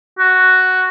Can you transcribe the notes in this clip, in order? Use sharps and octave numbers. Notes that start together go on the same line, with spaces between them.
F#4